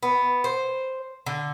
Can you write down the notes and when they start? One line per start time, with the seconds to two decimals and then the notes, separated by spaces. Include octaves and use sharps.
0.03 B3
0.44 C5
1.26 D3